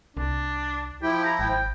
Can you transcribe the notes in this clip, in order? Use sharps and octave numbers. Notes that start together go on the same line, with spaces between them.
C2 D4
F3 E4 G4
A#5
G#1 G5